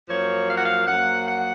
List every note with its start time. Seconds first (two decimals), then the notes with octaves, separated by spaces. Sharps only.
0.09 F#2 F3 A#3 C#5
0.48 F5
0.56 F#5
0.64 F5
0.87 F#2 F3 A#3 F#5
1.27 F#5